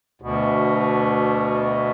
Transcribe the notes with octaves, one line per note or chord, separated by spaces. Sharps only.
D2 B2